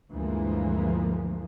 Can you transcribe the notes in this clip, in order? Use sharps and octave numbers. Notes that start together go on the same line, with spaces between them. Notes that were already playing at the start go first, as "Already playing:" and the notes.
D2 G2 E3 F3 G#3 A#3